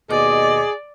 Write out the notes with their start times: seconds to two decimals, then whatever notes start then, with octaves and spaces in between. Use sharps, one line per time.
0.11 D#2 B2 G#4 D5 D#5 D6